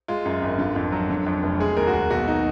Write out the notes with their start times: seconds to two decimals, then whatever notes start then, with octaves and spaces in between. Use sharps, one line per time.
0.08 G#3 F4
0.26 F#2
0.42 G#1
0.58 D3 F4
0.76 F2
0.92 F#3
1.10 D3
1.26 F2
1.43 F1
1.60 G#3 G#4
1.77 D#2 A#4
1.87 F#4
1.94 D#2 G#4
2.10 B1 F#4
2.28 D#4